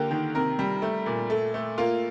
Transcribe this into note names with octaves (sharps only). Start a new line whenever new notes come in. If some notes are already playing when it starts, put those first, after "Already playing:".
Already playing: D3 A#3 G4
D#3
C3 A#4
G3
A3
A#2
A3 A4
A3
A#3 F4